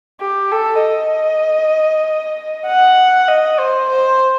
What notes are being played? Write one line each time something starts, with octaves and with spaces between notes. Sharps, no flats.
G4
A4
D#5
F#5
D#5
C5
C5